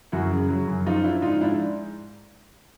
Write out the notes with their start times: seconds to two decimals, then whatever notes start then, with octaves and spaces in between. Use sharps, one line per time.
0.12 F#2 E4 F#4
0.31 C#3
0.49 F#3
0.67 F#2
0.86 F3 D#4 F4
1.04 F3 D4 E4
1.22 G#2 D#4 F4
1.41 G#2 D4 E4